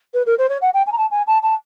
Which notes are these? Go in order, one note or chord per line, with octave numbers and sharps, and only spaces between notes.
B4
A#4
C5
C#5
F#5
G5
G#5
A#5
A5
G#5
A5
A5